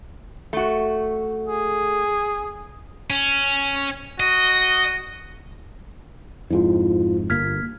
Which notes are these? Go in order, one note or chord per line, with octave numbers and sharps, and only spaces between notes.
A3 F#4
G#4
C#4
F#4 D#5
F2 G#2 E4 F4
G1 A#3 F6 G#6 B6